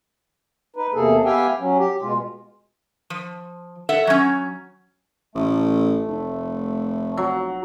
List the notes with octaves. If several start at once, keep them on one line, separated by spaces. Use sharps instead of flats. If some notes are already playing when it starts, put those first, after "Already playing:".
D#4 B4
E2 C3 A#3 G#4 A4
B3 G4 E5 F5 G5 G#5
F#3 C#4
G4
B2 G#3 F4
F3
A4 E5 F#5
F#3 C#4
A1 A3
F1
F#3